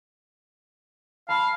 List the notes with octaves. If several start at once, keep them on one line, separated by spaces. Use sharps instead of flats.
F5 A5 B5 C6